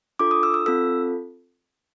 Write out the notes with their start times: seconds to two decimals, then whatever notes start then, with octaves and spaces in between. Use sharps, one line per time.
0.19 D4 F4 A4 D6
0.31 D#6
0.43 E6
0.54 E6
0.66 C4 F4 A4 E6